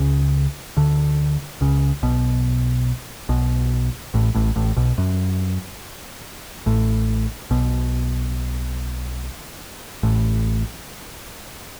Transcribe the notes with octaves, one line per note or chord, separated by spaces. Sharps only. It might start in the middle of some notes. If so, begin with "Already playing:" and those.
Already playing: C#2 C#3
D2 D3
C#2 C#3
B1 B2
B1 B2
A1 A2
A1 A2
A1 A2
B1 B2
F#2
A1 A2
B1 B2
A1 A2